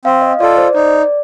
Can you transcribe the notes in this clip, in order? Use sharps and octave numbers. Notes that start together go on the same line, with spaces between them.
C4 F5
D#5
F4 A4 D5
C5
D#4 D5